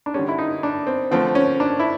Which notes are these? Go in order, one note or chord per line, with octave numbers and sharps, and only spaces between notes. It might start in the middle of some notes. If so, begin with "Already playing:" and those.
D4
D3 G3 C#4
E4
D#4
D4
C4
D3 F3 A3 C4
C#4
D4
E4